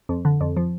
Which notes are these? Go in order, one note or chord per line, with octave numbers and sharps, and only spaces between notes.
F2
D3
F2
F3